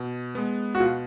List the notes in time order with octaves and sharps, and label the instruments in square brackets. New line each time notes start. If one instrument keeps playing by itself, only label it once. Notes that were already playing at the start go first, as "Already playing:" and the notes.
Already playing: [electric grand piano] B2
G#3 B3
[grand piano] F#4
[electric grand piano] B2 [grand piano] F4